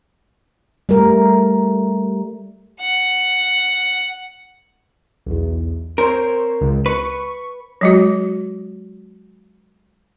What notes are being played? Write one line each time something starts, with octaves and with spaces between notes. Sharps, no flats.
G3 A3 A#4
F#5
B1 E2
C4 A#4 C5 C#5
C#2
B4 C#6
F#3 G#3 F#4